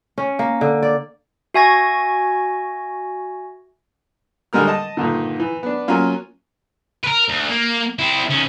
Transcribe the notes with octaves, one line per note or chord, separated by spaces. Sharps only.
C#4
A#3
D3
D5
F#4 E5 G#5 C#6 G#6 A#6
D3 G3 G#3 A#4 F6
D#5 A5
G2 A#2 D3 D#3
E3
B3 D4
F#3 A#3 C#4 F4
A#4 B4
D2
A#3
C4 E4
D#3 C#4